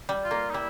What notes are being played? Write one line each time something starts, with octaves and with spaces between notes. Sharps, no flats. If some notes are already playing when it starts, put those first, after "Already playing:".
G3
F4
A#3
D#4
G3 E4